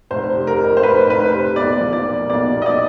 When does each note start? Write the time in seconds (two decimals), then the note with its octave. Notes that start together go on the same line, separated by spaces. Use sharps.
0.11 F1 C5
0.35 C3
0.47 A#4
0.59 F2
0.77 C5
0.83 F1 B4
1.08 F1 B4
1.20 C5
1.32 C3
1.56 B1 D5
1.81 F3
1.93 D5
2.05 A#2
2.30 B1 D5
2.54 B1
2.62 D#5
2.66 D5